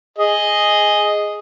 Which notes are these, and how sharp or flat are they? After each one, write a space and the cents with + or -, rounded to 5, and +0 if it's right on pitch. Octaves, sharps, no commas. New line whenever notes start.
G#4 +0 D#5 +0